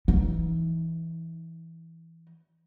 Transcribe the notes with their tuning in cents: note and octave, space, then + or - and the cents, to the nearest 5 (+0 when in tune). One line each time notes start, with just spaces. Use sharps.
E3 +0 D#4 +30